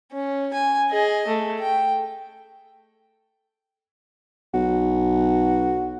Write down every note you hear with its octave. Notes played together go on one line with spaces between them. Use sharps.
C#4
G#5
G#4 D#5
A3
G5
B1 F#4